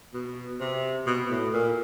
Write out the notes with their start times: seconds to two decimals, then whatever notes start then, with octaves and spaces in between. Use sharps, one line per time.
0.14 B2
0.60 C3
1.07 B2
1.30 A2
1.53 A#2